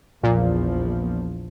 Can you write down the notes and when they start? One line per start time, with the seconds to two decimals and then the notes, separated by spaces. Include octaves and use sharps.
0.23 A#1 E2 A#2 F3